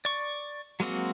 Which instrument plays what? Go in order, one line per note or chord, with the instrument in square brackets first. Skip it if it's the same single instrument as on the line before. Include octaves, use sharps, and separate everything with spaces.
[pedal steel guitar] D5 C#6
F#3 G#3 A#3 C4 F#4